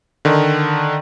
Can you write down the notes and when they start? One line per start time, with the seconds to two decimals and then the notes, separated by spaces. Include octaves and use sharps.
0.25 D3 D#3